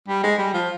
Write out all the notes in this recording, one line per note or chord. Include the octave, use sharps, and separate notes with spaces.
G3
G#3
G3
F3